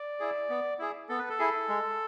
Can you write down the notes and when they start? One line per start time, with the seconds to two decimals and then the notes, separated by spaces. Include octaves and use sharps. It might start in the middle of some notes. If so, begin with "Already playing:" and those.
Already playing: D5
0.20 E4 G#4
0.50 B3
0.79 E4 G#4
1.09 B3 A4
1.19 B4
1.29 A4
1.39 E4 G#4
1.69 G#3